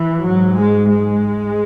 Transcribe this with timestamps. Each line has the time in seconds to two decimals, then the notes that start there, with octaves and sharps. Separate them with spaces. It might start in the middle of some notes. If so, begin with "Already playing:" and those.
Already playing: E3
0.22 G#2 F#3
0.55 G#3
0.88 G#3